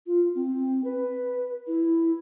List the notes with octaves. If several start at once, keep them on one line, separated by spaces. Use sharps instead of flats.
F4
C4
B4
E4